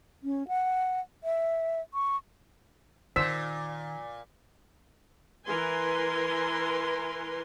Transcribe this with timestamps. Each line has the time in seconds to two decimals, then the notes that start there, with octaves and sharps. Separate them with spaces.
0.24 C#4
0.48 F#5
1.24 E5
1.94 C#6
3.16 A#2 D#3 C5 E6 B6
5.46 E3 A#4 B4 G#5 C6